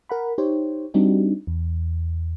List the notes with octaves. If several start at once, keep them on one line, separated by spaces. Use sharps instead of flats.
A#4 F#5 B5
D#4 G4 C5 C#5
G3 C4 D4 D#4 F#4 G4
E2